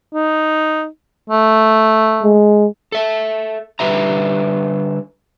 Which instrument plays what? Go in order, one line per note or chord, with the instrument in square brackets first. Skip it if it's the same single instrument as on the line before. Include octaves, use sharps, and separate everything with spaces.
[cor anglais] D#4
A3
[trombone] G#3
[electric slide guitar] A4 E5
D3 G3 G4 B4 E5 A#5